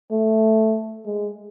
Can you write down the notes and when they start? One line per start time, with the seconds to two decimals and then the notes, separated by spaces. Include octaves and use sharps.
0.11 A3
1.05 G#3